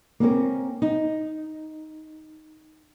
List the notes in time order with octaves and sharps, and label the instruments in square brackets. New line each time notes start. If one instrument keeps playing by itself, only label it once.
[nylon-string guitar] A#3 C4 C#4 A#4
D#4